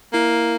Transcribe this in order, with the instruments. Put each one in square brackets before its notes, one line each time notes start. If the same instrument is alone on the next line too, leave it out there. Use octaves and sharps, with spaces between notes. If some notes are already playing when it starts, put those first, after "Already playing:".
[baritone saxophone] A#3 [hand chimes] E4